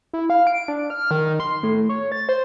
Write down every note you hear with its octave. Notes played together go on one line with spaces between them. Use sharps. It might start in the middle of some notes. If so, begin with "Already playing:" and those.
E4
F5
D7
D4
F6
D#3
C6
A2
C#5
A6
C5